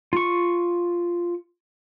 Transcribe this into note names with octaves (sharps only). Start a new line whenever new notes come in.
F4 C#6